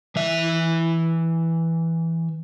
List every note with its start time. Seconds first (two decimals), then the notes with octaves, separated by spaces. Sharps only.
0.16 E3 E5